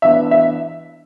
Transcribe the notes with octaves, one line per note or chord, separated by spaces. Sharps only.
E3 B3 D4 E5
E5